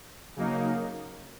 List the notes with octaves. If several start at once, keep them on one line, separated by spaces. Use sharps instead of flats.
C#3 F#3 A#3 D#4